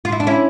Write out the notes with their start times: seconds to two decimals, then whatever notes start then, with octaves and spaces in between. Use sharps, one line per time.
0.05 F4
0.12 E4
0.20 D4
0.27 C#4 E4